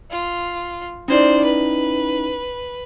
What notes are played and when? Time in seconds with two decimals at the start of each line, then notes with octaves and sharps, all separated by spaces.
0.11 F4
1.08 C#4 D#4 E4 C5 D5
1.44 B4